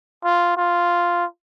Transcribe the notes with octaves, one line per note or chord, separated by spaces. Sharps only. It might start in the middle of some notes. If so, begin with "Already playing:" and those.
F4
F4